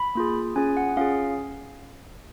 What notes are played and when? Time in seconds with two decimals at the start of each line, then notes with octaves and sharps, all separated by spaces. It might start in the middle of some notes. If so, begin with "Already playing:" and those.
Already playing: B5
0.15 A#3 F4 G#4
0.56 C#4 F4 G#4 G#5
0.77 F#5
0.97 C#4 F4 G#4 F5